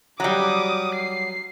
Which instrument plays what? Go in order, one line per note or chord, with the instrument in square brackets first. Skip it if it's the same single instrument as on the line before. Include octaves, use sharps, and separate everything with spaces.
[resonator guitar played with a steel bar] F#3 G3 [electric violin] D6 D#6
[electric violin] C7